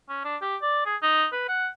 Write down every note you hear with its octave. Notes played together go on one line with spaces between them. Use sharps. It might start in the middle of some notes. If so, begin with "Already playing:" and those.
C#4
D4
G4
D5
G#4
D#4
B4
F#5